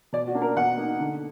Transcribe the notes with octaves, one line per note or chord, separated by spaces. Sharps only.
B2 D5
F#4
A#3 D4
A#4
B2 F#5
A#3 D#4
D3